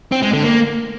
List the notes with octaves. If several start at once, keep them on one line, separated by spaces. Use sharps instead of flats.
C4
G#3
D3
A#3